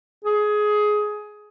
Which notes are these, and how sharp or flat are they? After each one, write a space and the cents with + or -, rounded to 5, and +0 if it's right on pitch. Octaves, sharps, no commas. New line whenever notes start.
G#4 +15